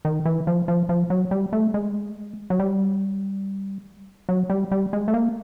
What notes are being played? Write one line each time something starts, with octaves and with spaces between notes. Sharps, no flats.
D#3
E3
F3
F3
F3
F#3
G3
A3
G#3
F#3
G3
F#3
G3
G3
G#3
A3
A#3